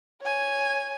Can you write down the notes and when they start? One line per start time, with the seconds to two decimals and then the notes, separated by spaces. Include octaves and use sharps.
0.22 C#5 G#5